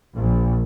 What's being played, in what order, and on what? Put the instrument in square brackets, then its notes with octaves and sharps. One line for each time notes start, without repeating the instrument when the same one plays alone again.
[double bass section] A#1